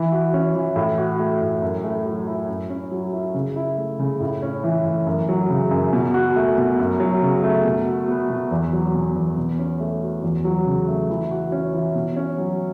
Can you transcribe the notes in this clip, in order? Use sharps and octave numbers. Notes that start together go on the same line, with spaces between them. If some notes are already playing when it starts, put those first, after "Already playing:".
Already playing: E3
F#4
C#4
E3
A2
F#4
A3
A2
F#2
A3
F#3
E4
F#2
C#4
F#3
E4
C#3
E4
A3
C#3
A2
C#4
E3
A2
F#2
F#3
C#3
F#2
B2
F#4
A3
B2
F#2
F#3
C#3
A3
B2
F#4
B3
B2
E2
F#3
B2
E2
B2
C#4
A3
F#4
E2
F#3
C#3
A3
E3
F#4
C#4
E3
B2
C#4
F#3